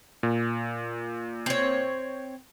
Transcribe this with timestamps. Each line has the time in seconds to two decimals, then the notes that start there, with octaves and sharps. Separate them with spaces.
0.23 A#2
1.46 C4 C#5